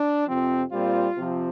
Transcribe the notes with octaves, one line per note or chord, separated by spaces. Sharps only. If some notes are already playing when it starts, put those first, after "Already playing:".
Already playing: D4
F2 C3 F3 C4
A#2 G3 C4 F4
C3 F3 C4